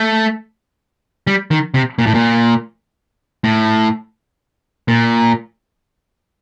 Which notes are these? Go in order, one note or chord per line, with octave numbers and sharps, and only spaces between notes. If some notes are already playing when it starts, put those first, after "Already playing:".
Already playing: A3
G3
D#3
C3
A#2
A2
A#2
A2
A#2